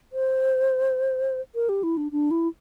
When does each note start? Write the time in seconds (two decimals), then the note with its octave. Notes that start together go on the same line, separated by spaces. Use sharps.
0.13 C5
1.55 A#4
1.69 G4
1.83 E4
1.97 D4
2.12 D4
2.31 E4